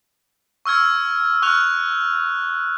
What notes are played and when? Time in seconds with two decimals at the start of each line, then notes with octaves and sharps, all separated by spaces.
0.65 C#6 E6 F6 G#6
1.42 C#6 F6 F#6 F7